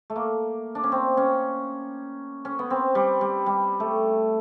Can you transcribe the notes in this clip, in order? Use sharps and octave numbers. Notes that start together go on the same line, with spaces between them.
A3
A#3
D4
C#4
C4
C#4
C#4
B3
C4
G3
G3
G3
A3